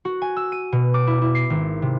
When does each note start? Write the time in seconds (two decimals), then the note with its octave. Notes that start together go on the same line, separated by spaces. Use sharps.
0.05 F#4
0.22 G#5
0.37 E6
0.52 D#7
0.72 B2
0.94 D6
1.07 E4
1.22 E4
1.35 C7
1.50 G#1
1.82 C3